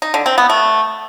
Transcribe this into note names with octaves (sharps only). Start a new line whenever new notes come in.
D#4
D3
C4
B3
A3